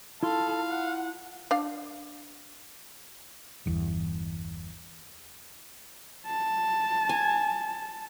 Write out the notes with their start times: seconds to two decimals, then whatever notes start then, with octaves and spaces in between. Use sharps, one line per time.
0.23 E4 F4 A4 F5 C6
0.70 F#5
1.51 D4 F5
3.66 G1 E2
6.26 A5
7.09 G#5